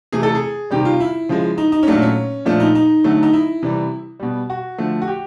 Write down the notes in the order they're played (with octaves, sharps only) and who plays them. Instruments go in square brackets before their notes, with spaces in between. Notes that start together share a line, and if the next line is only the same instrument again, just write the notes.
[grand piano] C3 E3 A3 G#4
A4
G#4
C3 D#3 G3 G4
F4
E4
C#3 F3 G#3
D#4
D#4
C#4
A#2 F#3 A3 D4
C#4
A#2 F3 A3 D4
D#4
D#4
D3 F#3 A3
D#4
E4
C3 E3 G3
B2 G3
F#4
D3 F3 A3
F#4
G4